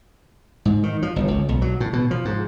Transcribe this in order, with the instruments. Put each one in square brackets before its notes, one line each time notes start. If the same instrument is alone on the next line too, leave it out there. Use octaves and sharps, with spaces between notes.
[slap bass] G#2
D#3
F3
G1
C#2
B1
F#3
A2
B2
F3
G#2